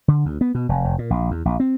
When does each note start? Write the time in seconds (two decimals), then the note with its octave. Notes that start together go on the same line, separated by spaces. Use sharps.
0.08 D3
0.25 D2
0.41 B3
0.55 B2
0.69 F1
0.85 F1
0.98 A#2
1.10 A#1
1.31 E2
1.45 A#1
1.60 C4